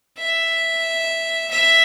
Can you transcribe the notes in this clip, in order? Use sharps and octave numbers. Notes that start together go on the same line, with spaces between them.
E5
E5